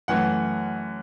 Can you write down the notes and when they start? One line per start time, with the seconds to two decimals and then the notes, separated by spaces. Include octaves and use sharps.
0.08 F#2 E3 A3 F#5